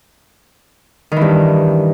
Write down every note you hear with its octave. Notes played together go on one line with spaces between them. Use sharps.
G2 D#3 E3